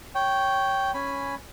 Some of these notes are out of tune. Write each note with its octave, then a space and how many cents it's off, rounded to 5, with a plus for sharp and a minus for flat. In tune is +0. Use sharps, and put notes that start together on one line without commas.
C#5 +0 G5 -10
C#4 +0 G#5 +0 B5 +0